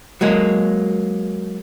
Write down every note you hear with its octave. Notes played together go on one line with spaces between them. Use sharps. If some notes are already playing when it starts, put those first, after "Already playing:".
F#3 G#3 A#3